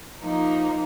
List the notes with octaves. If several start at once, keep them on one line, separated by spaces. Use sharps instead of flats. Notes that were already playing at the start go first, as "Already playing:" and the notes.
F3 A#3 D#4